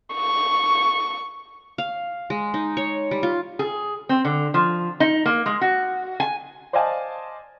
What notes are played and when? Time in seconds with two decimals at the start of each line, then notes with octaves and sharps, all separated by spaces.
0.15 C#6
1.78 F5
2.30 G#3
2.54 D#4
2.77 C#5
3.11 G3
3.23 F4
3.59 G#4
4.09 C4
4.25 D3
4.54 F3
5.00 D#4
5.26 A#3
5.46 G#3
5.61 F#4
6.20 G#5
6.73 C5 D5 D#5 F5 G#5 A5